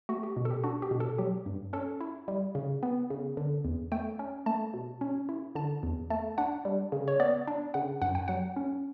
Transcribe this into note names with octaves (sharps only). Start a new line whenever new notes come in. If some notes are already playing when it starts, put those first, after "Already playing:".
A3 F#4
G4
B2
A4
G4
D4 F#4
G4
B2
A4
F#3 G4
G2
C#4 A4
E4
G3
C#3
B3
C#3
D3
E2
A3 G5
C#4
A3 A5
B2
C#4
E4
D3 A5
E2
A3 A5
D4 F#5
G3
C#3
C#5
B3 D5
D4
C#3 F#5
F#2 F#5
G5
F#3 F#5
C#4